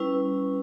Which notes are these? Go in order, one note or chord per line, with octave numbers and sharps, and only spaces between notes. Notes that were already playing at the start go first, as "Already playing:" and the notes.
Already playing: G3 C#4 E4 B4